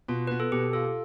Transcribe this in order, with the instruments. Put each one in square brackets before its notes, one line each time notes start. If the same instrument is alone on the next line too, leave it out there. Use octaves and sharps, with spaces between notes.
[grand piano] B2 [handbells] F4
[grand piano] B3 [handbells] B4
[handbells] A4
[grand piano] B2 [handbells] G4
[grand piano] F4 [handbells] A4